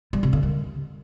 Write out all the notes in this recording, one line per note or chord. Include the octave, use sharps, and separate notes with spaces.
G3
C3
D3
D#3